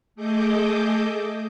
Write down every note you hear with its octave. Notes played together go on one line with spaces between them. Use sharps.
A3 G#4 A4 D#5 D6 G6